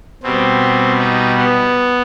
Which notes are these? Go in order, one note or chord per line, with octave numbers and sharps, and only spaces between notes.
B2 G3 C4
D#4
B3